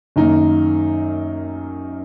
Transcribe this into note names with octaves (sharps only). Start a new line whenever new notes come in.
F#2 D#3 A#3 D#4